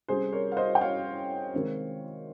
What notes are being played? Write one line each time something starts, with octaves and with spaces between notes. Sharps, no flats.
C3 G3 C#4 G#4 C5
A#4 C#5
F5
C5 D#5
G5
C#5 F5
C3 D#3 G#3 C4